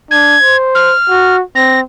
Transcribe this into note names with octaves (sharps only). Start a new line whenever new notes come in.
D4 G#6
C5
F6
F#4
C4 A#6